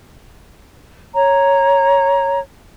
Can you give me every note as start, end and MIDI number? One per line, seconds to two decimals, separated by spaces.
1.13 2.38 73
1.13 2.38 82